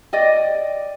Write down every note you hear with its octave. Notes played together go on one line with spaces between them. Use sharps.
D5 D#5 G5